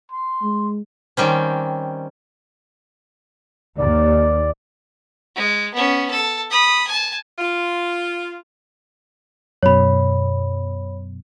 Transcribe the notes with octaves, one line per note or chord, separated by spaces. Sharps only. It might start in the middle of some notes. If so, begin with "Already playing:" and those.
C6
G#3
D#3 G3 C4 C#4
D#2 D5
G#3
B3 C#4
A4
B5 D#6
G#5 A5
F4
F#2 B2 C#5 B5